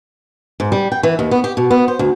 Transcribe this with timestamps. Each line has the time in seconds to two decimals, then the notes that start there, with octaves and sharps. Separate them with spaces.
0.60 G#2
0.72 G3
0.92 G5
1.03 E3
1.19 D#2
1.31 B3
1.44 G4
1.57 B2
1.71 B3
1.88 C5
1.99 D2